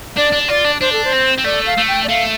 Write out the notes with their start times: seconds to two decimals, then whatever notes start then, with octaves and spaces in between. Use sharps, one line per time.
0.16 D4 D5
0.32 D4
0.49 F4 D5
0.65 D4
0.81 D4 C5
0.92 A4
1.04 C5
1.13 C4
1.38 C4
1.45 A3 D5
1.66 F5
1.77 A3
1.88 G5
2.04 D5
2.08 A3 F5